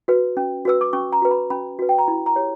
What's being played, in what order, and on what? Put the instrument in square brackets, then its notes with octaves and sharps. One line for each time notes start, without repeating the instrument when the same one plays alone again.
[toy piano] F#4 B4
C#4
F#4 B4 E6
D6
C#4 C#6
A#5
F#4 B4
B5
C#4 B5
F#4 B4
G5
A#5
E4 B5
A#5
G4 C#5